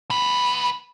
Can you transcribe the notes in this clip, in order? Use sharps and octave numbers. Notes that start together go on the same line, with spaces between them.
D2 B4